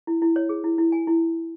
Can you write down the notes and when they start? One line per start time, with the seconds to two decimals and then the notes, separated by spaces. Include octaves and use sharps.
0.07 E4
0.22 E4
0.36 C#5
0.49 G#4
0.64 E4
0.78 E4
0.92 G#5
1.07 E4